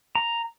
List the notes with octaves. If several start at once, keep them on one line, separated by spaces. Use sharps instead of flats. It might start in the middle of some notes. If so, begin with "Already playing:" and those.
A#5